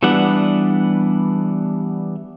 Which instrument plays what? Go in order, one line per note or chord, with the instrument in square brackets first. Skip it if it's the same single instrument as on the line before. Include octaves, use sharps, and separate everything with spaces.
[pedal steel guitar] E3 G3 B3 D4 F#5